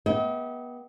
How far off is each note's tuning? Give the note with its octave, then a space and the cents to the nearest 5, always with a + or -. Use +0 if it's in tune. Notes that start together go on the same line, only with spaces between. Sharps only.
B3 -25 D#5 +45 G5 -30